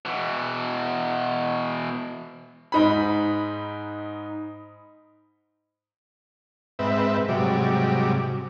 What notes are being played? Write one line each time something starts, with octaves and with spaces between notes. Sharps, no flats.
B2 E3
G#2 D#4 B5
G#2 C4 B4 E5
G#2 C3 F#3 G3 D6